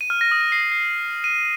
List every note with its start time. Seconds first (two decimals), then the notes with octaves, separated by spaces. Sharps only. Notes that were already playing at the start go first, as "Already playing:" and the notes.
0.01 D#7
0.10 F6
0.21 A#6
0.31 D#6
0.41 D#7
0.52 C7
0.61 A#6
0.72 C7
1.24 D#7